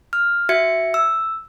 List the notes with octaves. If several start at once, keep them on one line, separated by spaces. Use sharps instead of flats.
F6
F#4 E5 G#6 C#7
E6